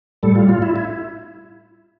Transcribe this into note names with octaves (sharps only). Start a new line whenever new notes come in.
A2 G3 A4
F4
F4
E4
E4